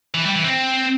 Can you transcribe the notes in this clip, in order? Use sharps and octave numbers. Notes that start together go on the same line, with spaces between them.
E3
G3
E3
C4